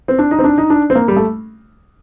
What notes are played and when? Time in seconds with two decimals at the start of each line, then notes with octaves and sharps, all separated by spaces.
0.08 C4
0.19 D4
0.31 D#4
0.39 C4
0.44 D4
0.58 D#4
0.70 D4
0.90 C4
0.95 A#3
1.08 G3
1.16 A3